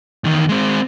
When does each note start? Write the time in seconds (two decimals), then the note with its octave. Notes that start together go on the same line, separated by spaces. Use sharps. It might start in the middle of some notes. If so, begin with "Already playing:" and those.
0.24 E2 D#3
0.49 G#3 C4